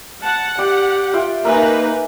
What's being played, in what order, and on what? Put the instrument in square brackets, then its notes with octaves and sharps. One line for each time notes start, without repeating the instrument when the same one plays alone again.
[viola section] F#5 [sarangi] A5
[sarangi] G4 [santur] D5 G5
[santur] F4 E5 G5
[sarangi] A#3 [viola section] D#4 B4 [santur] A#4 E5 G#5